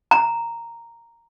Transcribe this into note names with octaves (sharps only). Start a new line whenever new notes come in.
A#5